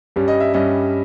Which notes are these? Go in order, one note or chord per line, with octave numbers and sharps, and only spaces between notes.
G2 G3 C#4
D#5
E5
G2 G3 C#4 D#5